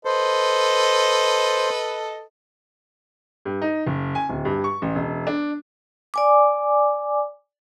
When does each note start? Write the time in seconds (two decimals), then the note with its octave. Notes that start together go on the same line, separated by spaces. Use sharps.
0.05 A4 B4 C5 D#5
3.45 G2
3.62 D#4
3.86 F#1
4.15 G#5
4.29 D1
4.45 G2
4.64 C#6
4.82 A1
4.95 E1
5.27 D4
6.14 D5 G#5 D6